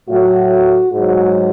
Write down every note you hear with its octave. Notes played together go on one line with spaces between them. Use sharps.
A2 F#3 F#4
G#2 F#3 F#4